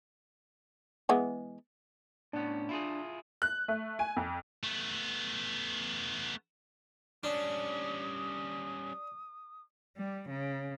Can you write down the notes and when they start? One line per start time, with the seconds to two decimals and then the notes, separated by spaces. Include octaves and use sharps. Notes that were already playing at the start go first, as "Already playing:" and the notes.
1.09 E3 G#3 B3
2.33 A2 B3 C#4 D4
2.69 E4 F4 G#4
3.42 F#6
3.68 A3
3.99 G#5
4.17 F2
4.63 A3 B3
7.23 G3 C#4 D4 D#6
9.97 G3
10.30 C#3